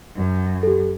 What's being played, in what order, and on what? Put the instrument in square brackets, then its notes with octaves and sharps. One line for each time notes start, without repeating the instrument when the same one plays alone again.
[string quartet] F#2
[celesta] G4 A4